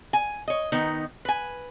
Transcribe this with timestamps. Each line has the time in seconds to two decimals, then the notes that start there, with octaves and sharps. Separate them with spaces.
0.13 G#5
0.48 C#5 D#5
0.72 D#3 B3 D#4
1.25 B4 G#5